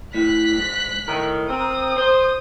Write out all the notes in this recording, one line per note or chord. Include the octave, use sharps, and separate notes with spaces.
A2 F#6 B6
G#2
A2 D#3 A#4
C4 D#6
C5